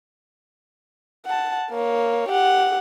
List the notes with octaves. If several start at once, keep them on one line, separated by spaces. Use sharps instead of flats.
F#5 A5
A#3 C#5
G4 F#5